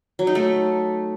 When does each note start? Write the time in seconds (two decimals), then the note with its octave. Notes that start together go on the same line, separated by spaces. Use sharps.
0.19 F#3
0.27 D#4
0.35 A3